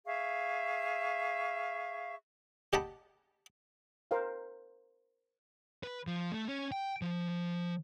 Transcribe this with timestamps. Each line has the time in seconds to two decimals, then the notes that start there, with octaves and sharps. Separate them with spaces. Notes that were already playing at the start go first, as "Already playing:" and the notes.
0.06 G#4 E5 F5 C#6
2.73 G4 D#5 F#5 G5 A5 B5
4.11 A#4 C5 F5 G5
5.83 B4
6.07 F3
6.32 A3
6.48 C#4
6.72 G5
7.02 F3